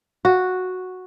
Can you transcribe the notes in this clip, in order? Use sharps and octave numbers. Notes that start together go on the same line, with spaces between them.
F#4